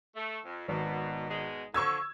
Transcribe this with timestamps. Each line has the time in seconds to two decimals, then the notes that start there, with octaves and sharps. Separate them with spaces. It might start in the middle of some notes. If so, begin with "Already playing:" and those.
0.16 A3
0.45 F2
0.68 G#1 B2
1.28 B2 G#3
1.74 D3 F3 C#6 E6 G#6